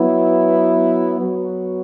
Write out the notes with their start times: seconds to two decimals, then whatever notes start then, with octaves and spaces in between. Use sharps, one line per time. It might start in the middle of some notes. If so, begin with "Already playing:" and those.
Already playing: F#3 B3 E4
1.20 F#3 B3 F#4